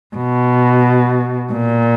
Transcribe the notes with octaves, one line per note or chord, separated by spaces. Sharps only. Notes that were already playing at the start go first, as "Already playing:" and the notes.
B2
A#2